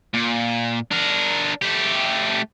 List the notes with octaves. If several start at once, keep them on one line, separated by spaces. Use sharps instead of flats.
A#2
D4 A#4
A3 G4